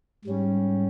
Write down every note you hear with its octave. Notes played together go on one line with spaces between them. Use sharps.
G#2 G3 C#4